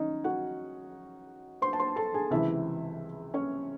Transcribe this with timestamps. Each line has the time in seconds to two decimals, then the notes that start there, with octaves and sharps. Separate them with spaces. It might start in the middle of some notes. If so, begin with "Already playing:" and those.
Already playing: D#3 C#4 D#4 D#5
0.24 F#4 F#5
1.62 C5 C6
1.73 A5
1.80 C5 C6
1.96 A4 A5
2.14 G#4 G#5
2.30 C#2 C3 E3 E4 E5
3.34 C#4 C#5